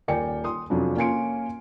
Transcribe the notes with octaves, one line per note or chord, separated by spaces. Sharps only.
D#1 A#4 D5 G5 G#5 C#7
C6 D#6
F2 C3 F3 F#3 C#4 D4
A#3 C#4 G#5 C6 C#7 D7